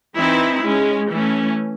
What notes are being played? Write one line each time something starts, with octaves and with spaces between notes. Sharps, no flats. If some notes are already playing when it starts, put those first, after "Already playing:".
E3 C4 D#4 E4
G#3 C#4
E3 A3 C#4